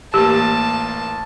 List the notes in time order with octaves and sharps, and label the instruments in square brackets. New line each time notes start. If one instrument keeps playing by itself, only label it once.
[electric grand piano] A1 A#3 [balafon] G4 [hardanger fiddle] A5